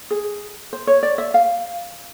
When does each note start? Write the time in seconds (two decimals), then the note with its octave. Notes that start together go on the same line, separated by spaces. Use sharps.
0.10 G#4
0.73 C5
0.87 C#5
1.03 D5
1.18 E5
1.34 F5